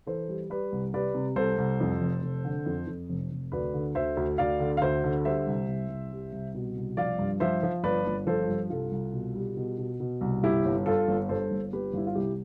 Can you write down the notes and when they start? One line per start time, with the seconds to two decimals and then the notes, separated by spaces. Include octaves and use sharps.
0.07 E3 A4 C5
0.28 G3
0.50 G3 B4 D5
0.72 C2
0.94 G3 B4 D5
1.15 C3
1.36 C2 A4 C5
1.58 C2
1.80 F2
2.01 F1
2.22 F1
2.45 D3
2.66 F2
2.87 F2
3.09 F1
3.31 F1
3.52 D2 B4 D5
3.74 D3
3.95 D2 C5 E5
4.17 D2
4.38 D2 D5 F5
4.60 D3
4.77 F5
4.81 D2 C5 E5
5.04 D3
5.25 G3 C5 E5
5.47 C2
5.68 C2
5.89 C2
6.12 G3
6.32 C2
6.54 B2
6.76 C2
6.97 F3 D5 F5
7.19 G2
7.40 F3 C5 E5
7.63 F3
7.83 G1 B4 D5
8.06 G1
8.27 F3 A4 C5
8.48 G2
8.70 C2 F4 A4
8.92 C2
9.13 B2
9.35 G3
9.57 B2
9.78 B2
10.00 B2
10.21 C2
10.43 G1 E4 G4
10.65 G1
10.86 G2 F4 A4
11.08 G1
11.29 G2 A4 C5
11.51 G1
11.73 G1 G4 B4
11.93 G1 E4
12.07 F4
12.15 C2 E4 G4